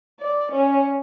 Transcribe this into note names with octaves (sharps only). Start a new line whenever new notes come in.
D5
C#4